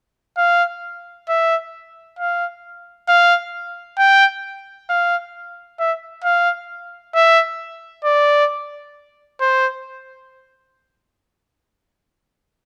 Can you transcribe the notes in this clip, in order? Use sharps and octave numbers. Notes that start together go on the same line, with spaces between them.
F5
E5
F5
F5
G5
F5
E5
F5
E5
D5
C5